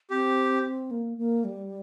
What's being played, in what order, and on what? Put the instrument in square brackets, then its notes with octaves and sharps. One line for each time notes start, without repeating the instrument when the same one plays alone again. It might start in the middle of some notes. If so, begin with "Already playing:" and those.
[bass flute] C4 [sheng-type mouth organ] G4
[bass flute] A#3
A#3
G3